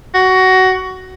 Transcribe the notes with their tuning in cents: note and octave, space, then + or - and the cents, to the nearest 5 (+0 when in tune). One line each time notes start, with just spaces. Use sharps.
F#4 +15